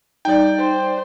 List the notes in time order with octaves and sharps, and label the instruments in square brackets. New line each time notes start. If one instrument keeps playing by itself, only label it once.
[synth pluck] G3 D#4 [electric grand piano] D5 G5
[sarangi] C5